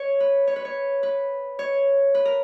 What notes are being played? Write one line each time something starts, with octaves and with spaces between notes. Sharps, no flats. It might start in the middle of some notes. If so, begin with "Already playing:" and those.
Already playing: C#5
B4
C#5
B4
C#5
B4
C#5
B4
A#4